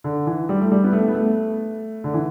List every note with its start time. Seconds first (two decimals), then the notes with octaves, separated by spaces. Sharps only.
0.04 D3
0.27 E3
0.49 G3
0.61 A3
0.72 G3
0.84 B3
0.93 A3
1.08 B3
1.14 A3
2.04 D3
2.14 E3